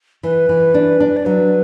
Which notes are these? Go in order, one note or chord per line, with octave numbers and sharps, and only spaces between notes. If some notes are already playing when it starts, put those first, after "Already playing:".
E3 B4
E3
D4
D4
D5
F#3 B4